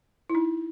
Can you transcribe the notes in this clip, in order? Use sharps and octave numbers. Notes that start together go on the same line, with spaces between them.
E4
D#4